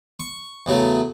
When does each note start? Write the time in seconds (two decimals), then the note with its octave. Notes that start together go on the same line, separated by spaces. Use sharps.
0.20 C#6
0.66 E2 C#3 F#3 A3